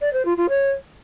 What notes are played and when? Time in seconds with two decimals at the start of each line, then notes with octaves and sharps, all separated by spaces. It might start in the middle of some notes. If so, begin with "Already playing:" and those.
0.01 D5
0.13 C5
0.25 F4
0.37 F4
0.49 C#5